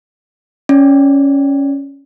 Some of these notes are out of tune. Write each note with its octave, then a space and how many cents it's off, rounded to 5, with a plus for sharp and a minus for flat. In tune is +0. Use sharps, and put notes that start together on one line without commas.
C#4 +0 D5 -10